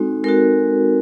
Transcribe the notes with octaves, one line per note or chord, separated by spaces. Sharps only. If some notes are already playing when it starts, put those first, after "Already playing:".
Already playing: G#3 C4 D#4 F#4 A4
G#3 C4 D#4 F#4 A#4